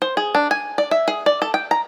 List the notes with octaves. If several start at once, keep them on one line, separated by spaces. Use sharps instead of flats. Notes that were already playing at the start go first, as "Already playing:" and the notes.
C5
G#4
D4
G#5
D5
E5
G#4
D5
A4
G5
A#5